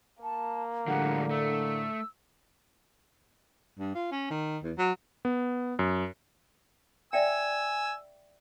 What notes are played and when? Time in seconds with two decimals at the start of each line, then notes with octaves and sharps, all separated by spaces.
0.23 A#3 A5
0.88 A2 D3 F3 G3 G#3 F#5
1.31 A3 E6
3.79 G2
3.95 F4
4.11 C#4
4.30 D#3
4.63 E2
4.78 F#3
5.25 B3
5.79 F#2
7.13 D5 E5 G5 G#5 E6